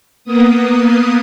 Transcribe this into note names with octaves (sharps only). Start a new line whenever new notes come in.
A#3 B3 D#6